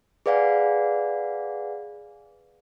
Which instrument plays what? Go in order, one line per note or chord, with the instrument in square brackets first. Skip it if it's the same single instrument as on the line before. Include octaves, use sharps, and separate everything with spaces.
[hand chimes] G#4 B4 D5 F5 F#5 G#5